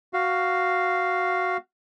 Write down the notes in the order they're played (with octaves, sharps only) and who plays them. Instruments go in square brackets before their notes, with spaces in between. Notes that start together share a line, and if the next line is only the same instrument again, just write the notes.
[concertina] F#4 F5